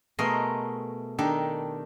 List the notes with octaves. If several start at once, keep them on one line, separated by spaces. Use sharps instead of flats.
B2 A3 G#4 A#4 D#5 C6
D#3 D4 D#4 G4 A4